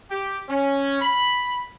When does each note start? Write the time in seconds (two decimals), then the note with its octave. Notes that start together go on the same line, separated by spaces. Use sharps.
0.11 G4
0.49 C#4
1.02 B5